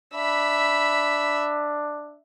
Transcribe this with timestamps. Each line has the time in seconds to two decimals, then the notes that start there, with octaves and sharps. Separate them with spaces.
0.14 D4 E5 B5